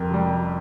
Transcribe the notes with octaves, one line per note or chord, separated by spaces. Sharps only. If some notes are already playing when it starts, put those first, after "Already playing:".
Already playing: F2 G4 A#4
C3 G3